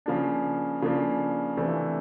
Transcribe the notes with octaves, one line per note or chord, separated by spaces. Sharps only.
C#3 F3 A#3 D4
C#3 F3 A#3 D4
C3 E3 A3 D4